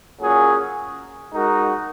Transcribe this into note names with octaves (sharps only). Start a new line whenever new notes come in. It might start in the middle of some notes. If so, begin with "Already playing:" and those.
A#2 F#3 C#4 G#4
G#3 D#4 F#4 A#4